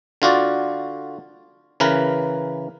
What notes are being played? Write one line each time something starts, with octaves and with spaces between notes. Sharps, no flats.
D3 F4 F#4 D5
C#3 E3 A#4 B4